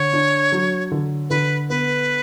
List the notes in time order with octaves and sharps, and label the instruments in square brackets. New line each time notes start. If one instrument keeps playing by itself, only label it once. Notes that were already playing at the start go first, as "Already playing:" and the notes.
Already playing: [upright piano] D3 [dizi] C#5
[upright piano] D4
F#3
D3
[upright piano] D3 [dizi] B4
[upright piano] B3 [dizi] B4